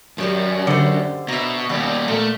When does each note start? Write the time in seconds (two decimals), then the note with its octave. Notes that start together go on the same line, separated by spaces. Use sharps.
0.18 F#2 D#3 F#3 G3
0.67 D3 C5
1.28 B2 E5 A#5
1.69 D#2 B2 G3 D5
2.08 A#2 A3 A#4